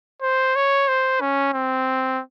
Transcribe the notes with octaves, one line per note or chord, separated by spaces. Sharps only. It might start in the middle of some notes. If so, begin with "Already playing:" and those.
C5
C#5
C5
C#4
C4